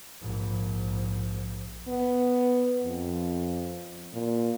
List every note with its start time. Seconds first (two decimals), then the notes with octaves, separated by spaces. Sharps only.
0.21 A#1 G#2
1.88 B3
2.83 F2
4.13 A#2